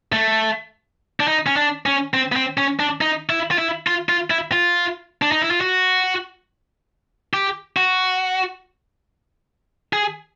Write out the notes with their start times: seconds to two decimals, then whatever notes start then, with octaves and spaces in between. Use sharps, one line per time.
0.13 A3
1.20 D4
1.28 D#4
1.47 C#4
1.57 D4
1.86 C#4
2.14 C4
2.32 B3
2.36 C4
2.58 C#4
2.80 D4
3.01 D#4
3.30 E4
3.51 F4
3.59 E4
3.87 F4
4.09 F4
4.31 E4
4.52 F4
5.22 D4
5.32 D#4
5.42 E4
5.51 F4
5.61 F#4
7.34 G4
7.77 F#4
9.93 G#4